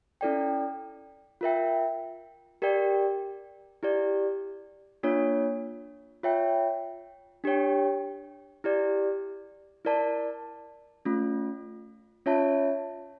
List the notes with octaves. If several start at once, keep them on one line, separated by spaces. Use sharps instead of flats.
C#4 E4 A4 D5 G5
F4 A#4 E5 G5
G4 A#4 D5 G5
E4 G4 D5
A#3 D4 F4 C#5
F4 C#5 E5 G5
D4 G4 C#5 G5
E4 G4 D5
E4 A#4 D5 A5
A3 C#4 F4
C#4 F4 C#5 E5 A5